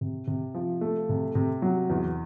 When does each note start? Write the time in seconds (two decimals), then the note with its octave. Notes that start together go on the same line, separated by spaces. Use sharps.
0.01 C3
0.27 C3
0.54 F3
0.81 A3
1.09 C3
1.35 C3
1.62 F#3
1.90 E2